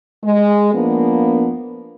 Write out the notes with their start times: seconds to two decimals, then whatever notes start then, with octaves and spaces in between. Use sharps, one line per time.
0.24 G#3
0.74 F3 A#3 B3 D4